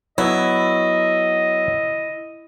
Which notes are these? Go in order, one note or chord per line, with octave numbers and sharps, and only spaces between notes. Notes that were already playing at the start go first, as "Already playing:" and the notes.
F#3 B3 E4 D#5